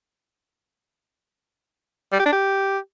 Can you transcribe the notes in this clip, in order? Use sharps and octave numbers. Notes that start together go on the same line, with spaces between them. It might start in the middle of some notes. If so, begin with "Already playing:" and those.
G3
G4
D4
G4